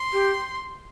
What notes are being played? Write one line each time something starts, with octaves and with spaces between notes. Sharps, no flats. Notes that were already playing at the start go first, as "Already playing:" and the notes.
Already playing: C6
G4